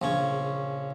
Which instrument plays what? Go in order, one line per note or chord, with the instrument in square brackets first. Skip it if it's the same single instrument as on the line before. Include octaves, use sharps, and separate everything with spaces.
[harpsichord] A#1 C#3 C#4